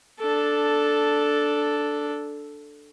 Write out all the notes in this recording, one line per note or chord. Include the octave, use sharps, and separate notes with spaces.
D4 A4